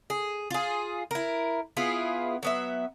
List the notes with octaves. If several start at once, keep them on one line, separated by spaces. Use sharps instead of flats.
G#4
F4 G#4
E4 A#4
B3 E4 F4 G#4
F#3 B3 E5